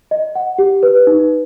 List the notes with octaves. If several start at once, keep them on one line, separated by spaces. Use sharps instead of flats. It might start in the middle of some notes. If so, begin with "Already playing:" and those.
D#5
F#5
G4
B4
D#4